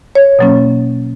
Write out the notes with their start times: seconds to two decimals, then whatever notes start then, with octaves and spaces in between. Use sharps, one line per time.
0.15 C#5
0.39 B2 F#3 A#3 C#4